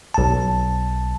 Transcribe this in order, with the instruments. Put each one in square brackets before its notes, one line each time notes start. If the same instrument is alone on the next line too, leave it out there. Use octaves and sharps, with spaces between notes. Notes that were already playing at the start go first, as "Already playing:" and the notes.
[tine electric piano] B1 A5